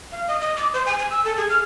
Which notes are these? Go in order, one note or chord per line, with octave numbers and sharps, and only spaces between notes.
F5
D#5
D#5
D6
C5
G#5
G#5
E6
A4
G#4
F6